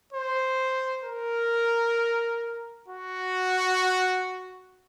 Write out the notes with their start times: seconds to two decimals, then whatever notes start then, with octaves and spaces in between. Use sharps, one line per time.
0.13 C5
1.04 A#4
2.88 F#4